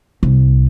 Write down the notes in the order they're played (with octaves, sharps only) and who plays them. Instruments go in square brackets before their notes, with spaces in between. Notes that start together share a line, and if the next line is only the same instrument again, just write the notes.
[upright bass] C2